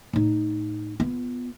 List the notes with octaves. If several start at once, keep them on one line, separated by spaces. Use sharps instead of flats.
A2 D#4
B3 F4